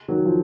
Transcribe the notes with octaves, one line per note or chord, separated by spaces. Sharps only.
D#3 F#3
F3